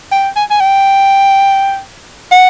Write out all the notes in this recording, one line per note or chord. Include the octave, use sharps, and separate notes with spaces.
G5
G#5
G#5
G5
F#5